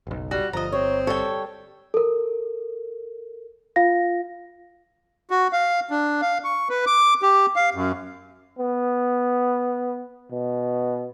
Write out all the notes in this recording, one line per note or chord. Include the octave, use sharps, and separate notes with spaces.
F#1 B1
G3 F#4
G1 F3 D#5 A#5
C4 C#5
G3 A4 C#5 F5 G5
A4 A#4
F4 F5 A#6
F#4
F5
D4
F5
C#6
B4
D6
G4
F5
F#2
B3
B2